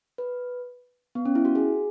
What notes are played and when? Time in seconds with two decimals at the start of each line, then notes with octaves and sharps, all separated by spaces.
0.18 B4
1.15 B3
1.25 C#4
1.35 E4
1.45 F#4
1.55 G#4